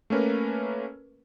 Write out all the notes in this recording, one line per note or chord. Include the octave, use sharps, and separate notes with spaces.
A3 A#3 C#4 A#4 B4